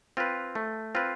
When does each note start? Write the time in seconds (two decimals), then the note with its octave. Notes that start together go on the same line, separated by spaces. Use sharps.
0.17 C4 F4 B4
0.55 A3
0.95 C4 F4 B4